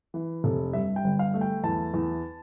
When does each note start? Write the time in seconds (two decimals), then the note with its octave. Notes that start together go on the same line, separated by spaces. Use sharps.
0.14 E3
0.44 F1 A4
0.73 G2 E5
0.96 G5
1.04 G1
1.19 F5
1.34 A3
1.41 G5
1.64 E2 A5
1.94 E2